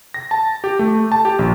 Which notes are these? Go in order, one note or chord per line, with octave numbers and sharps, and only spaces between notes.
A#6
A5
G4
A3
A5
G4
A#1